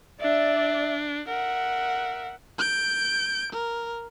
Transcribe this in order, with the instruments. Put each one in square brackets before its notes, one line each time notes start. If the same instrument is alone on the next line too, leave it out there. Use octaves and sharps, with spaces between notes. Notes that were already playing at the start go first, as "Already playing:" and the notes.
[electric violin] D4 [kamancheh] D5 E5
[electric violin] A#4 E5 [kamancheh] F#5
[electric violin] G6 D7
A#4